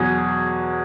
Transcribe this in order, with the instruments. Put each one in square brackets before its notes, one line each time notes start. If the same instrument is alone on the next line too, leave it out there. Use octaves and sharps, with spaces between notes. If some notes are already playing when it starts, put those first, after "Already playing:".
Already playing: [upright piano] E2 B2 F#3 [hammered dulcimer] F#4 G#4